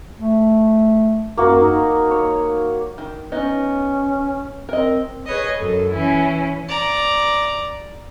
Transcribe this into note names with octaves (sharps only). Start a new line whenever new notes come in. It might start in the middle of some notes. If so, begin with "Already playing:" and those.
A3
F#2 A#3 F#4
D#4
C#5
D#3
B3 C#4 D#4 D#5
C4 A#4 D#5
G#4 B4 C#5 D#5
F#2 A4
E3 C#4 E4
D5 A#5